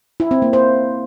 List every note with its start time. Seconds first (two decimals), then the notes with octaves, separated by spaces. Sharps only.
0.20 E4
0.31 C4
0.42 A#3
0.53 C5